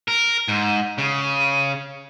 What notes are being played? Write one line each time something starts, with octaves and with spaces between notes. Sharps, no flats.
A#4
G#2
C#3